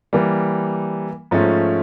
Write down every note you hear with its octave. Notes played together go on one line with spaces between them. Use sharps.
E3 G3 A#3
G#2 F3 A3 C#4